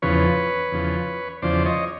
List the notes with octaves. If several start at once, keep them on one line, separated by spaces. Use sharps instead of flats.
E2 C#3 F3 B4 C#5
E2 C#3 F3
E2 C#3 F3 C5 D5
C#5 D#5